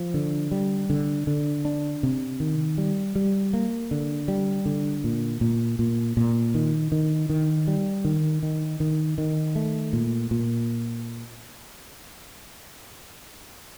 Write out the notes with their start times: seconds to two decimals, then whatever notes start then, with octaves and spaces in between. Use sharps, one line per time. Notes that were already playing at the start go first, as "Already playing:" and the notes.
Already playing: F3
0.14 D3
0.52 G3
0.90 D3
1.27 D3
1.65 D4
2.03 C3
2.40 D#3
2.78 G3
3.15 G3
3.53 A#3
3.91 D3
4.28 G3
4.66 D3
5.04 A#2
5.41 A#2
5.79 A#2
6.17 A#2
6.54 D#3
6.92 D#3
7.29 D#3
7.67 G3
8.05 D#3
8.43 D#3
8.80 D#3
9.18 D#3
9.56 A3
9.93 A#2
10.31 A#2